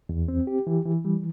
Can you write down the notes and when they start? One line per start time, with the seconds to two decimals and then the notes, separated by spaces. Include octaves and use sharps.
0.09 E2
0.28 C4
0.47 G4
0.67 E3
0.85 E3
1.05 G3